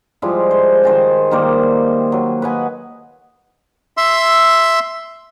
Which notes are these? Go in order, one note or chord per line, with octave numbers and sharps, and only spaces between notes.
F3 G3 G#3 E4
C5
D#3 C5 G#5 A5
D#3 G3 A#3 C5
F#3
B4 D#5 F#5 G#5
E5 C6 E6